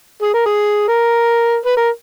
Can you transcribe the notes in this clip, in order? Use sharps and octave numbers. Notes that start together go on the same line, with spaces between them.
G#4
A#4
G#4
A#4
B4
A#4